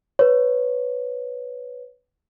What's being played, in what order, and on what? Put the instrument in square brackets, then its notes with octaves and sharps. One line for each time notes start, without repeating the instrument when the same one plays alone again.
[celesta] B4 C#5